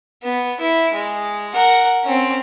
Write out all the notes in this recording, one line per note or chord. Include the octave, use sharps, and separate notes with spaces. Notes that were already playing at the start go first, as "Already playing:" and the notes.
B3
E4
G#3
A#4 F#5
C4 C#4